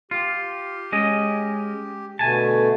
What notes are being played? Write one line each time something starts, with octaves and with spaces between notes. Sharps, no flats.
F4 G4
G#3 C#4 D#5
B2 D3 A3 G#5 A5